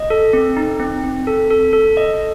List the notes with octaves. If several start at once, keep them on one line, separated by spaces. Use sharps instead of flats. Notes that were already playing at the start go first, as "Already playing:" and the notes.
Already playing: D#5
A4
C4
D#4
C4
C4
A4
A4
A4
D#5